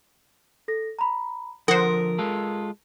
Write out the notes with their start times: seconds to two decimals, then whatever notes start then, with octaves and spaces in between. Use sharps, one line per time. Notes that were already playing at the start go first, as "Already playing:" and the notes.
0.68 A4 A#6
0.99 A#5 B5
1.68 D3 F3 A#4 C5 F#5 D#6
2.19 G#3 F4 A4